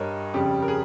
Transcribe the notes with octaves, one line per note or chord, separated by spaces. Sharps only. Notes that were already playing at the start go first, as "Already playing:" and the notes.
Already playing: G2 A#4 C#5 D#5
F2 C#3 G3 G4
A#4
G#4